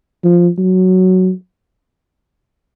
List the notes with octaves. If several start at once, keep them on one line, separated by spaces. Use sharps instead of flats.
F3
F#3